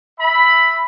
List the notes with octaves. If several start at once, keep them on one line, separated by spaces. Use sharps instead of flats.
E5 B5